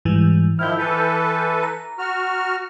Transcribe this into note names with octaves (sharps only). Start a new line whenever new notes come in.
G#2 E3 G3
D#3 F3 E4 F6 G6
E3 A4 B4
A#5
F#4 F6